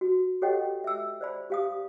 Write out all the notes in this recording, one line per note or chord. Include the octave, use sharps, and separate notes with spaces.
F#4
G4 A4 C#5 D#5 F#5 G5
E5 E6
C5 D5 B5
G4 F5 D#6